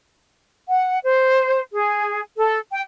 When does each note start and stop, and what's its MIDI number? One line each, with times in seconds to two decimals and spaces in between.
0.67 0.98 78
1.03 1.60 72
1.72 2.21 68
2.37 2.58 69
2.71 2.81 79